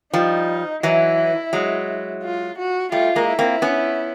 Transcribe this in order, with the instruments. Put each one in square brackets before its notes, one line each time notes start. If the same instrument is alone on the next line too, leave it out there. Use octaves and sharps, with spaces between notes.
[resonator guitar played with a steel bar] F3 G3 [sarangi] D#4
[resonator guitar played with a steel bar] E3 F#3 [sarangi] E4
[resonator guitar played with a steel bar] F#3 G#3
[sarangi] F4
F#4
[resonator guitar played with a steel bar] G3 A3 [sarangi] F4
[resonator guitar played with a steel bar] G#3 A#3
[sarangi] E4
[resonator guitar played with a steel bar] A#3 C4
B3 C#4